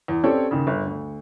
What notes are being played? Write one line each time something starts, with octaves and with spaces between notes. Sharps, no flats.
E2
C4 C#4 G4 A4 C#5 D5
D#2 C#3
G1
D2